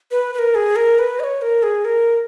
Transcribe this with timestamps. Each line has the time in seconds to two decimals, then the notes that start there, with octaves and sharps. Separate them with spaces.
0.11 B4
0.34 B4
0.39 A#4
0.55 G#4
0.76 A#4
0.99 B4
1.20 D#5
1.24 C#5
1.42 A#4
1.63 G#4
1.85 A#4